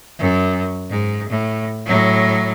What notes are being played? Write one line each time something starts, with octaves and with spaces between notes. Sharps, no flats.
F#2
G#2
A2
A2 F#3